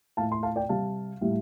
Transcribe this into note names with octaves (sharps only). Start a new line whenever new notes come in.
A2 A3 F5 A5
C6
F5 A5
D5 G5
C3 G3 F5 A5
A2 G3